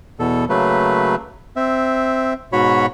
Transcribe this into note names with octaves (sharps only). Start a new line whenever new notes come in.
E2 B2 A4
C#3 F#3 A3 A#3 B4
C4 E5
G#2 B2 F#4 C#5 B5